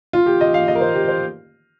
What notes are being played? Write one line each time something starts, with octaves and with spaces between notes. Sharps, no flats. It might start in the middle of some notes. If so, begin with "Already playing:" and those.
F4
G4
D#5
F5
D#5
A#4
C5
G4
C5